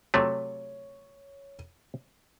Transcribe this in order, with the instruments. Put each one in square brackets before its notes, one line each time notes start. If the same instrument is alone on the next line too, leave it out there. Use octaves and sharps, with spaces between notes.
[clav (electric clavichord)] C3 F#3 A3 [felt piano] C#5